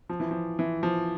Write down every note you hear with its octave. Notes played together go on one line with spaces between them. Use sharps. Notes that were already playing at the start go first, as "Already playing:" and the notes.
F3
E3
F3
E3
F3